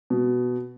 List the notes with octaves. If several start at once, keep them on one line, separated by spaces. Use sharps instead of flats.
B2